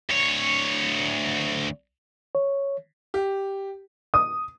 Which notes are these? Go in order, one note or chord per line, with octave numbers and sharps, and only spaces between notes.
D2 C#5
C#5
G4
D#6